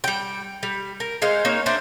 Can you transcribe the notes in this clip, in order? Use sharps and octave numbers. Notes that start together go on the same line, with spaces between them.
G3 G5
G3
A#4
G#3 D#4 C5 F5
A#3 D#4 C#5
D4 C5 E5